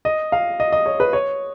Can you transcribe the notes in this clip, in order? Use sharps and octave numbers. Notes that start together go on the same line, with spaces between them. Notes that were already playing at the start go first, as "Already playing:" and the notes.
D#5
F5
D#5
D#5
C#5
B4
C#5